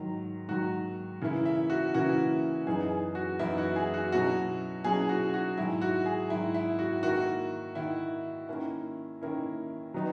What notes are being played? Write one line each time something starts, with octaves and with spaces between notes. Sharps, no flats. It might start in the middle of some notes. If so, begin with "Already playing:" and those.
Already playing: G#2 D#3 F#3
G#2 D#3 F#3 F#4
C#3 E3 A#3 C#4 E4
E5
F#4
C#3 E3 A#3 C#4 E4 F#4
F#2 E3 B3 D#4 G#4
G#4
F#4
F#2 E3 B3 D#4 E4
F#4
G#4
F#4
B2 F#3 C#4 E4 F#4
B2 F#3 C#4 E4 G#4
F#4
F#4
G#2 D#3 F#3 E4
F#4
G#4
G#2 D#3 F#3 E4
E4
F#4
D#3 A#3 E4 F#4
D#3 A#3 E4
D#3 A#3 C#4 E4
D#3 A#3 C#4 E4
D#3 F#3 B3 D#4